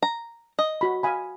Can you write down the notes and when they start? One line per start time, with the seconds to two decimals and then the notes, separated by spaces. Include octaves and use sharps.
0.02 A#5
0.59 D#5
0.81 F#4 B5
1.03 F5 G#5 B5